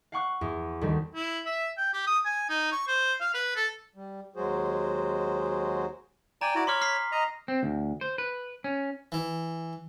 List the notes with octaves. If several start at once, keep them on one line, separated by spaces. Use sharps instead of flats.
F5 F#5 C#6 F#6
E2
D2 D#3 G3
E4
E5
G5
G4
D#6
G#5
D#4
C#6
C5
F5
B4
A4
G3
D#2 F#3 G#3 F#4 G#4 C5
D5 G5 G#5 A#5
E4 F#4 D5
C#5 B5 C6 D6 F6
F6 B6 C7
D#5 A#5
C4
D2
C5
B4
C#4
E3